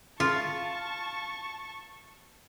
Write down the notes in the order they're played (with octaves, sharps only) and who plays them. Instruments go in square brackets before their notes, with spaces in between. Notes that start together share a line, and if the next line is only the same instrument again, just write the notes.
[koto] F4 [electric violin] A5 C#6